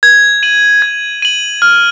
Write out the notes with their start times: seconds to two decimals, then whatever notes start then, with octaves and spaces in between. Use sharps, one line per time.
0.03 G#6
0.43 D#7 F#7
0.82 G#6
1.22 D#7 F#7
1.62 F6